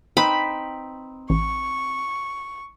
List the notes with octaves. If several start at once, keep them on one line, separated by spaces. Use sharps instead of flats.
C4 D#4 B4 B5
A1 C#6